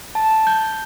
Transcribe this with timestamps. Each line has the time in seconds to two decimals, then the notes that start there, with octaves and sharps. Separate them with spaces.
0.15 A5
0.47 G6